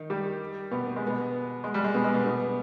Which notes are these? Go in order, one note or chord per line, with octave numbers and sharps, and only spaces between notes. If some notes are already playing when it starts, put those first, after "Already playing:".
Already playing: D#3 D#4
G3 G4
B2 B3
B3
G#3
B2 B3
G#3
G3
G#3
B2 B3
G#3
B2 B3
B2 B3